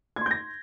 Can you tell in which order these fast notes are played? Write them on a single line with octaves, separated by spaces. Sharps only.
G#6 C6 G6 A#6